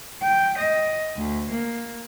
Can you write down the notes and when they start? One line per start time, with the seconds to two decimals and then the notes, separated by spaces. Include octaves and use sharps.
0.23 G5
0.59 D#5
1.17 D2
1.51 A#3